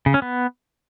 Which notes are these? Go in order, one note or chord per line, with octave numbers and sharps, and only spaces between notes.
C#3
C#4
B3